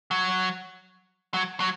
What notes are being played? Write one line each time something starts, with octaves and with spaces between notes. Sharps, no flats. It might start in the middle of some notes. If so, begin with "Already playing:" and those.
F#3
F#3
F#3